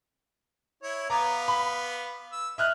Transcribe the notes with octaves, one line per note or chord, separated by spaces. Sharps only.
E4 C#5
B3 F5 A#5 D6
B5
E6
D#5 E5 F6 F#6